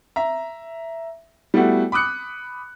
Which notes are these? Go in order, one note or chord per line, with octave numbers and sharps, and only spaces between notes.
E5 A#5
G3 A3 B3 E4 F#4
B5 D6 D#6 F#6 C#7